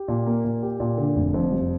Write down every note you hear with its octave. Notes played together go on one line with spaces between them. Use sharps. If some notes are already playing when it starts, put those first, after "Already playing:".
Already playing: G4
A#2
A#3
A#2
G4
A#2
D3
F1
F2
G3